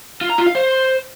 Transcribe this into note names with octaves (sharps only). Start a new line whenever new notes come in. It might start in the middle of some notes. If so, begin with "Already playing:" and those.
F4
A#5
F4
F5
C5